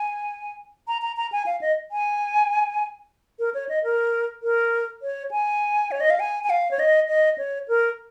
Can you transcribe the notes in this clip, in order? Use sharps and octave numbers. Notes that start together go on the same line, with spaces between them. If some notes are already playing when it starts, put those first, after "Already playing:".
Already playing: G#5
A#5
A#5
A#5
G#5
F5
D#5
G#5
A#4
C#5
D#5
A#4
A#4
C#5
G#5
C#5
D#5
F5
G#5
G#5
F5
C#5
D#5
D#5
C#5
A#4